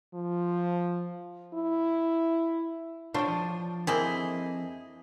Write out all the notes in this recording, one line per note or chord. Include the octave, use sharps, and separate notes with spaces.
F3
E4
D4 F4 C5 C#5 G5
F3
F2 A#3 C4 E4 G#4 D#5